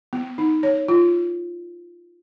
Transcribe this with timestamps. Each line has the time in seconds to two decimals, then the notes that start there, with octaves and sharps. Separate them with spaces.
0.13 B3
0.38 D#4
0.63 C#5
0.88 F4